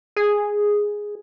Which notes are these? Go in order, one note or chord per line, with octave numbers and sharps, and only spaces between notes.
G#4